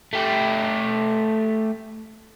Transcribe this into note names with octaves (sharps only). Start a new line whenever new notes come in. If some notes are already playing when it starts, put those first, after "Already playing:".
A3 G4